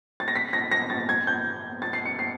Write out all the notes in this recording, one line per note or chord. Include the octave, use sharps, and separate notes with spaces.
A6
A#6
B6
A#6
A#6
A6
G#6
G6
A6
C7
C#7
C7